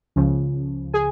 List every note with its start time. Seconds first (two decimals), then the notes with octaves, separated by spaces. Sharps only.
0.16 C#2 C#3 F3
0.94 G#4 G#5